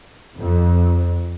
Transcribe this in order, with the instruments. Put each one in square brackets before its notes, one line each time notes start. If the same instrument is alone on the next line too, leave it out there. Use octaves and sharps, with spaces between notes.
[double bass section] F2